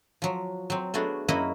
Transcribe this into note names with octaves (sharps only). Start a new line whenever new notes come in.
F3 F#3
F#3 C4
A3 B3 D4 F#4 G#4
F#2 A#3 E4 F#4 D#5 B5